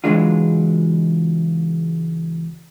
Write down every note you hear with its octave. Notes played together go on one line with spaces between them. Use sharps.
C#2 E3 F#3 G#3 D4 F4